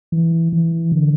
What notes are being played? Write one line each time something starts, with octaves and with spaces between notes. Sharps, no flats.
E3
E3
D3